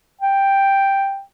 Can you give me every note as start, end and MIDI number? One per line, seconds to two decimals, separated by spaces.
0.21 1.21 79